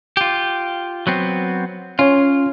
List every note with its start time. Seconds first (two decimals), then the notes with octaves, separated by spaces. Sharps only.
0.17 F4 G4
1.07 F#3 B3 C4
1.99 C#4 F4 C#5